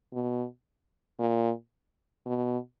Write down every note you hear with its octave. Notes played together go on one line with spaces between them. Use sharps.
B2
A#2
B2